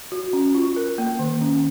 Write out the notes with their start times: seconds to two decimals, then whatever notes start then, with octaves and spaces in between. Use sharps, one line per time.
0.12 F#4
0.33 C#4
0.54 F4
0.76 A#4
0.98 A#3
1.19 D#3
1.41 C#4